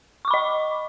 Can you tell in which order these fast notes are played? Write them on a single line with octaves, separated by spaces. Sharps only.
C#6 D6 B5 D#5